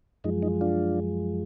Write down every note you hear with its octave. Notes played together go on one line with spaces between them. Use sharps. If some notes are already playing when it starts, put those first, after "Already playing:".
F#2 F3 G#3 D#4
D#4
D4 F4